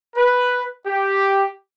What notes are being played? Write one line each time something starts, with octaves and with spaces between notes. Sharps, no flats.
B4
G4